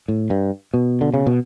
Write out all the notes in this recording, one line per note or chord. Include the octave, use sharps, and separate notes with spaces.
A2
G2
B2
D3
C#3
B2